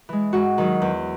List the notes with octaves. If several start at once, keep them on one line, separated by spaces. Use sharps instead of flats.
E3 G#3
G#2 F#4
D#3 F#3
E2